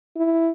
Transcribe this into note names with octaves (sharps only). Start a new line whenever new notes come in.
E4